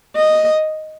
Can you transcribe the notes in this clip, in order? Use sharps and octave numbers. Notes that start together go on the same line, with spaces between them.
D#5